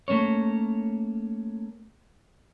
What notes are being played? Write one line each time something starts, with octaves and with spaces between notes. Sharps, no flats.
A3 A#3 C#4 C#5